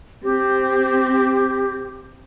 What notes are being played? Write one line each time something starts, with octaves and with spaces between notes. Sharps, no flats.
C4 G4